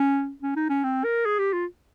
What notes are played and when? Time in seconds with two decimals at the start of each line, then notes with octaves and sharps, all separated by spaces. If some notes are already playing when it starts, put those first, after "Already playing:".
Already playing: C#4
0.42 C#4
0.56 D#4
0.69 C#4
0.84 C4
1.04 A#4
1.25 G#4
1.39 G4
1.53 F4